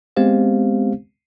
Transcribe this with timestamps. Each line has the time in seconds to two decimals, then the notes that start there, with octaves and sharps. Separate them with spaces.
0.17 G#3 B3 C4 G4 C5 F5